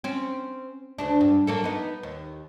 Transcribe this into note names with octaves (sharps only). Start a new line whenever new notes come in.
C4 C#4
D2 C#3 D4
G2
F#3 A#3 A4
B3 D#4
D#2